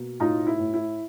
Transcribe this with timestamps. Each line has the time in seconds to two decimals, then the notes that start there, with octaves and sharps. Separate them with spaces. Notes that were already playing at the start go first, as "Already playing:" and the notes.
Already playing: B2 A#3
0.20 A2 D#4 F4
0.47 E4
0.59 A2
0.74 E4